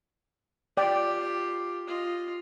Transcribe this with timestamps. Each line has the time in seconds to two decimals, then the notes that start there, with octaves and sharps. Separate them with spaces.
0.77 F4 G4 D5 G5
1.87 F4 D#5